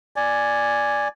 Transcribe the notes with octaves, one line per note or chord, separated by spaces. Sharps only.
D5 G#5